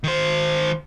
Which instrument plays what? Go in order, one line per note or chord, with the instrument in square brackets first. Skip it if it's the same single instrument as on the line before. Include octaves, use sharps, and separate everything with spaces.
[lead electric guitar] D#3 C5